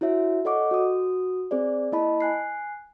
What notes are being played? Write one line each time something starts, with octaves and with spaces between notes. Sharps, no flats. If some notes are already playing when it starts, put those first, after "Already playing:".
E4 F#4 C#5 E5
A4 C#5 D#5 F#5 C#6 D6
F#4 D#6
C4 G#4 C5 D5
A#3 E4 D#5 A5 B5
G#5 F#6 C7